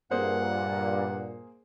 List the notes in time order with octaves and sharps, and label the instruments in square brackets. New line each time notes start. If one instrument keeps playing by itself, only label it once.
[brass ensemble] G2 A#2 [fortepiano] A#3 G#4 C5 [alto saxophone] F#5